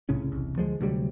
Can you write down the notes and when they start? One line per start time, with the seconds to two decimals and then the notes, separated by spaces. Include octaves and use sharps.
0.09 C2 A2 C#3 C#4
0.32 E1 C2
0.56 D2 F3 G3 G#3
0.81 D2 C3 F#3 G3